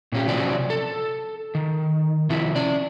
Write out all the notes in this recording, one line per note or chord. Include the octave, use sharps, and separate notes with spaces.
A#2 C#4 G4
C3 F3 F#3 C#4 D5
A4
D#3
C3 F3 E4
C#4 D5